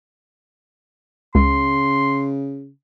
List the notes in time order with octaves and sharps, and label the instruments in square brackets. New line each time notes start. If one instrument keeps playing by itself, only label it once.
[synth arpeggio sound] C#2 [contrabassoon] C#3 [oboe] C6